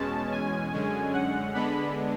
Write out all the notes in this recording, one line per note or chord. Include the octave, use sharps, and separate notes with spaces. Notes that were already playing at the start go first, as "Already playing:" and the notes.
Already playing: E2 B2 G#3 C#4 A5
G#5
F#2 D3 G#3 C#4
F#5
D3 G#3 B3 D4 B5